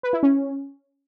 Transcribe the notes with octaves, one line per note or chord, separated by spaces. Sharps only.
B4
E4
C#4